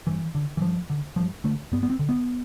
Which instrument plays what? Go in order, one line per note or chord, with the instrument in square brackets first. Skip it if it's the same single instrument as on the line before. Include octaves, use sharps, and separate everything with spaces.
[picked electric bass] G2 E3
D3
E3
G2 F3
D3
G2 F3
D3 A3
G2 B3
B3
C4
D3
B3